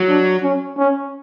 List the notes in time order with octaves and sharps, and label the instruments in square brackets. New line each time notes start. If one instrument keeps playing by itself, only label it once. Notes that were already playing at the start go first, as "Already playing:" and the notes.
Already playing: [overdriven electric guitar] F#3
[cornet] D4
C#4
C#4